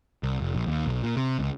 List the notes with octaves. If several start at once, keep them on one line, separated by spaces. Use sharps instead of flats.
C2
F1
A#1
D#2
B1
A#2
C3
C#2